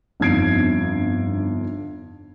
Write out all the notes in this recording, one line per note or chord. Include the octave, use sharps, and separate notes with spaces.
G1 F2 D#4 G#6 C7 D7